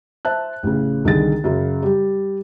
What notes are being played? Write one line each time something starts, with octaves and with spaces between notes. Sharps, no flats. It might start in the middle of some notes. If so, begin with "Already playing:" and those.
C5 E5 A5 F#6
A1 C#3
C2 D3 D#3 G#4 A6
F#2 C#3 F#3
G3 G4